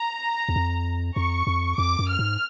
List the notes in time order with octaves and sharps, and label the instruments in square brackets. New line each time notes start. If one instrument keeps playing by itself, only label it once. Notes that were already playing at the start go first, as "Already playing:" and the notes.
Already playing: [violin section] A#5
[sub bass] E2
F2
[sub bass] F2 [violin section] C#6
[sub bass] F2
[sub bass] F2 [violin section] D6
[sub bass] F#2
[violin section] F6
[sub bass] G#2